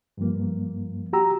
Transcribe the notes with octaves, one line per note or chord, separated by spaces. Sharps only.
G2 F3 A#3
F#4 G4 A#5 E6